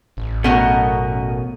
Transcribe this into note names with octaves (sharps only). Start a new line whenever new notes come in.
A1
F#2 B2 A3 C#4 F#4 A#4 D#5 F#5